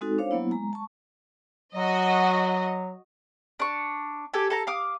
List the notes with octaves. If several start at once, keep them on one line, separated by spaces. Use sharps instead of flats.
G#3 C4 D#4 F#4 A4
D4 C5 C#5 F5
F#3 A#3 B3 E4
G#3 A#5
A5 C#6
F#3 F#4 D#5
D4 C#6
G4 A4 G#5
A4 A5 A#5
F5 D6 D#6